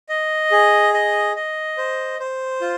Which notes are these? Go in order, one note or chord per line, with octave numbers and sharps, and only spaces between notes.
D#5
G#4
D#5
D#5
C5
C5
F4